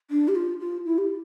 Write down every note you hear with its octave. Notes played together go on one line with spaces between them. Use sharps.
D4
G4
F4
F4
E4
G4